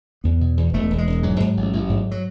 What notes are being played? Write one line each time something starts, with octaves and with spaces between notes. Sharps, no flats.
E2 B3
B2
E2
E1 A3
E1
G#3
E1
G#2 F#3
G#2
A1
A1
G#2
F#3